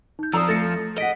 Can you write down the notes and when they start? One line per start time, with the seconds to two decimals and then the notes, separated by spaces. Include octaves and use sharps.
0.19 D#4 G6
0.33 F2 F3 A4 D5 A#5 D#6 E6
0.49 A3 A6 A#6 C#7
0.98 G#4 D#5 F#5 B6 D7